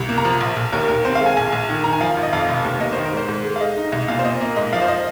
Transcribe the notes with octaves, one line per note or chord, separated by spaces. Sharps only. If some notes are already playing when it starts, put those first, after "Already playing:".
Already playing: C2
A#3
A#5
F3
A#1
A#1
D#2 A#4
D#2 A#4
C4 C5
F5
G#3
G#5
A#1 G#5
A#1
D#3
D#3 A#5
G#5
F3 F5
G#1
D#5
F2 F5
F1
D#2
A#3 D#5
D#3 C5
A#4
G#2 C5
G#2
G#3
F5
G#3 D#5
D#4
C2 D#5
A#2 F5
C5
A#2 D#5
A#3
G#2 D#5
F3 F5
C5
D#5